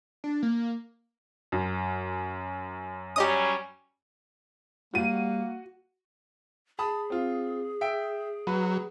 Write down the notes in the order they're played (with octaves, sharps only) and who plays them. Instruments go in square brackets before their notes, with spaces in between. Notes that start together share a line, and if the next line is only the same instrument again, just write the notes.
[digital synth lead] D4
A#3
[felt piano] F#2
[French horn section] F#3 G3 C#4 [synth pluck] G4 D#5 D#6
[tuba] G3 [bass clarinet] A#3 [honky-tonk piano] F#4 D#7
[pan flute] G#4 [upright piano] A5 B5 D#6
[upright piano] C4 F4
E5 G5 D7
[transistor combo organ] F#3 [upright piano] B4